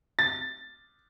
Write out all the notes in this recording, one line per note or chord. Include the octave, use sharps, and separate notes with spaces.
A6